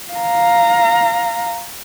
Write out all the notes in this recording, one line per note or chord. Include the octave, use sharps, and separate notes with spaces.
F5 A#5